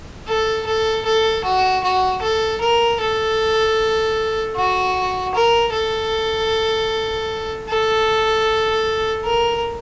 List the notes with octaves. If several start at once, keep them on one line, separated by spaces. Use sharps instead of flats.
A4
A4
A4
F#4
F#4
A4
A#4
A4
F#4
A#4
A4
A4
A#4